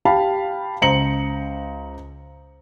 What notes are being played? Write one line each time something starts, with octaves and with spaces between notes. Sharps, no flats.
G4 F5 A5 B5
C#2 C5 A#5 C#7 F#7